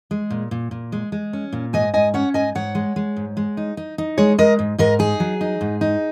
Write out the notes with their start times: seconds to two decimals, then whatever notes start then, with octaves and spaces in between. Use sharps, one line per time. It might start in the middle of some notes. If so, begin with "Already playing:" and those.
0.11 G#3
0.30 A#2
0.51 A#2
0.71 A#2
0.92 G#3
1.12 G#3
1.33 C#4
1.53 A#2
1.73 G#2 D#5 G#5
1.94 G#2 D#5 G#5
2.14 C#4 C#5 F#5
2.34 G#2 D#5 G#5
2.55 G#2 C#5 F#5
2.75 G#3
2.96 G#3
3.17 G#2
3.37 G#3
3.57 D#4
3.77 D#4
3.98 D#4
4.18 G#3 G#4 C#5
4.38 G#3 A#4 D#5
4.59 G#2
4.78 G#2 A#4 D#5
4.99 D#4 G#4
5.20 F#3
5.41 D#4
5.61 G#2
5.81 D#4